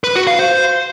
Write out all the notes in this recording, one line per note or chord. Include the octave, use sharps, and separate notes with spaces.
B4
F#4
F5
C5